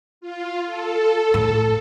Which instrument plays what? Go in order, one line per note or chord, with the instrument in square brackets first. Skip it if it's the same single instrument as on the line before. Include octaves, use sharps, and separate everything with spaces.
[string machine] F4
A4
[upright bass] A2